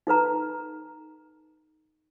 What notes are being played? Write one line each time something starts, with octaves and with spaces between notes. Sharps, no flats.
D#4 A4 B4 A#5